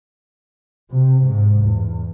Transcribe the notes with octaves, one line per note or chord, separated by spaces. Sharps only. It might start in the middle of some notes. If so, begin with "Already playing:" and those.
C3
G#2
E2